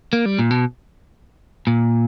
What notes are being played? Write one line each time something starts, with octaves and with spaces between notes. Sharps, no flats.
A#3
G3
A#2
B2
A#2